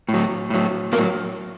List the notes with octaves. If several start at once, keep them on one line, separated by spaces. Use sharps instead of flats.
A2
F#3
A2 F#3
A2 F#3 A#3 A#4